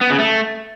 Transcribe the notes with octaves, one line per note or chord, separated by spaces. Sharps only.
B3
C#3
A3